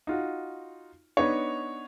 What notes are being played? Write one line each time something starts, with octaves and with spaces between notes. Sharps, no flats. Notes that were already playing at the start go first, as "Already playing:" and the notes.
D#4 F4 F#4
B3 D4 D#4 B4 C#5